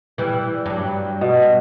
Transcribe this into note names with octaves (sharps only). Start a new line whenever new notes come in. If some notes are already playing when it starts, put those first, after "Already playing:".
E3 G3
G2 F#3
B2